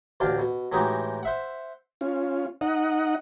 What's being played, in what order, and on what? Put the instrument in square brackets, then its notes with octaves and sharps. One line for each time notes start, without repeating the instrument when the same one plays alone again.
[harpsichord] A1 D2 D4 F5 G5
B2
A2 E3 G#3 D#4 F#4 G4
C5 E5 F#5
[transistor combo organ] C#4 F4
D#4 D#5 F#5